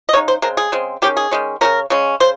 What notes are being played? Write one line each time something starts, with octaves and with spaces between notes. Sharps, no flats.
D#5
C#3 G#3 D#4 C#5
C5
C#3 G#3 C4 A#4
G#4
C#3 G#3 C4
D#3 G#3 C#4 G4
G#4
D#3 G#3 C#4
C#3 G#3 C#4 A#4
C#3 G#3 C#4
C#3 C5